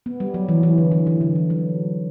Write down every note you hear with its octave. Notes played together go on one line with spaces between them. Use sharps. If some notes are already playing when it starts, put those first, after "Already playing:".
B3
G3
F#3
E3
E3
D3
E3
E3
D3
E3
F#3